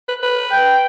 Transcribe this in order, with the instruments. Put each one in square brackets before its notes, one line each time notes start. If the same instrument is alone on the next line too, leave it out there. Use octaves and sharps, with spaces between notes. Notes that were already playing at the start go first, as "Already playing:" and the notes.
[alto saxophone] B4
B4
[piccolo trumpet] G5